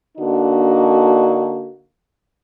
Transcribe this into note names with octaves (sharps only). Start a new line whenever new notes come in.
D3 A#3 D4 D#4 F#4